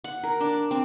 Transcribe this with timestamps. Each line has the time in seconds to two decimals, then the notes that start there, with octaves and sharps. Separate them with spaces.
0.04 F#5
0.24 A#4
0.41 D4
0.71 C4